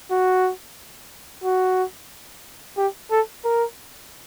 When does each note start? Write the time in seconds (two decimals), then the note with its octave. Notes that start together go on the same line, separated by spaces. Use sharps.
0.11 F#4
1.44 F#4
2.77 G4
3.11 A4
3.45 A#4